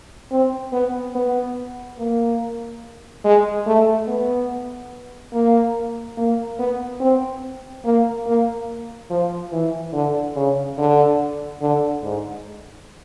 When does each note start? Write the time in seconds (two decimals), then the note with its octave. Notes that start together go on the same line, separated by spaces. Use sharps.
0.31 C4
0.72 B3
1.15 B3
1.99 A#3
3.24 G#3
3.66 A3
4.08 B3
5.33 A#3
6.17 A#3
6.59 B3
7.00 C4
7.85 A#3
8.27 A#3
9.10 F3
9.52 E3
9.93 D3
10.36 C#3
10.77 D3
11.61 D3
12.02 G#2